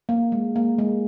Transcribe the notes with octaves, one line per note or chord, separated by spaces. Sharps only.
A#3
G#3
A#3
G#3